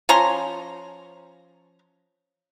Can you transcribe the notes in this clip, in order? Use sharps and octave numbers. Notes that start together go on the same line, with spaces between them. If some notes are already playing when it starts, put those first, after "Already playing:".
F3 C#4 A#5 C6